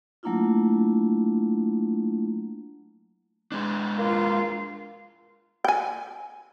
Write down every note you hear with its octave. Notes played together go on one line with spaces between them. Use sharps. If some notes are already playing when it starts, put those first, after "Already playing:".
F#3 A3 A#3 D4 E4 F4
G#3 D4
A#3 F4
G5 G#5